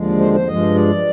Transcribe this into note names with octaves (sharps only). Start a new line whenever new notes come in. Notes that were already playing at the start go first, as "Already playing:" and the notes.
Already playing: D#2 D3 F3 G#3
C5
C5
G2 F3 G#3 D#5
D5